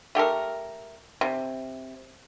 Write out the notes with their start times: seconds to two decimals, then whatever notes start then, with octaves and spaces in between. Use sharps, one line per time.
0.15 A3 G4 A4 A#4
1.21 C3